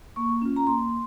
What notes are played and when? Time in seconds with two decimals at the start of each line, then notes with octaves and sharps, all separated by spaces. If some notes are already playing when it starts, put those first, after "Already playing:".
0.16 A#3 C#6
0.42 C#4 F4
0.56 A#5
0.67 A#3 C6